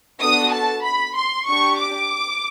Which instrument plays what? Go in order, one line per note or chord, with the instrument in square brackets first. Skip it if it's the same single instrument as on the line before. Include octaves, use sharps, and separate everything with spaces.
[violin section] B3 D4 F#4 A4 D#6
A5
B5
C6
D4 G4 C#6
D6